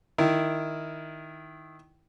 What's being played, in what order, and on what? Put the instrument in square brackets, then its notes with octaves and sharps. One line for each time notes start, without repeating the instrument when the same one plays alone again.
[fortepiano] D#3 E4